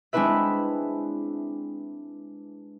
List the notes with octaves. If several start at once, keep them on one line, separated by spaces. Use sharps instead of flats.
G#3 C4 D4 E4 B4 E5